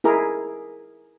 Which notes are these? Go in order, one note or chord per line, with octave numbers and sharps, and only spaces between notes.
E4 G#4 A#4 A#5